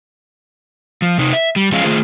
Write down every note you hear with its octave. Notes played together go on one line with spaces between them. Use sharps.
F3
C3 D#4
E5
G3
F3 G#3 C#4 F4
D#3 A3 F4 G#4 C5